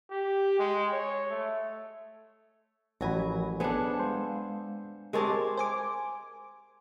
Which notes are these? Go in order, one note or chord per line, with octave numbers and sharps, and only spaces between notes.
G4
G#3
C#5
A3
A1 F3 F#3 A#4 G#5 A#5 B5
B3 D4 G#4 A4 C5
G#3 C5 F5
G#3 C4 G4 G#4 A#4 C#5 A5 D6
C5 G#5 D6